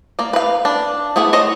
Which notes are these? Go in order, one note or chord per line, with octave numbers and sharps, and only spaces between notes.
A#3 D5
B4 F5
D4
A3 B3 E4 G#4
C5 C#5 D#5